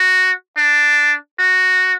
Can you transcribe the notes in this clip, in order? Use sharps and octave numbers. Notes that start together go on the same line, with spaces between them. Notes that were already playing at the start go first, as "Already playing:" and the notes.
Already playing: F#4
D4
F#4